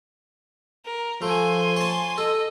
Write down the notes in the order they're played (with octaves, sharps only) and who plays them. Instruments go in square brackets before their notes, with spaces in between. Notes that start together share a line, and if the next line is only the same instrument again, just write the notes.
[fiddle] A#4
[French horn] F3 [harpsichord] A3 [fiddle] G#5 C6
[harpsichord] C#5 A5
[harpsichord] A4 [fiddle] D#5